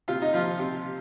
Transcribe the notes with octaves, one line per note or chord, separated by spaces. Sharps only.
C3 F4
D#4
F3 F4
C3